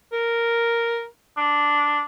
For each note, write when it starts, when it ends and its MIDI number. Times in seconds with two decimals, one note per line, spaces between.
0.13 1.06 70
1.37 2.04 62